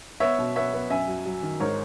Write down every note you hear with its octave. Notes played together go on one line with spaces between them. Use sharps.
B3 C#5 E5
B2
B3 C#5 E5
B3
F#2 E5 G#5
F#3
F#3
D#3
G#2 A#4 C#5